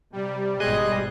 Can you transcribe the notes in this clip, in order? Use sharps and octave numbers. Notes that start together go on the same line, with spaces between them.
C3 G3
G#1 B2 G#3 G#4 D#5 F#6